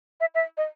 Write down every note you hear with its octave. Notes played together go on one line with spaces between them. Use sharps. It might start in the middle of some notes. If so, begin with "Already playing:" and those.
E5
E5
D#5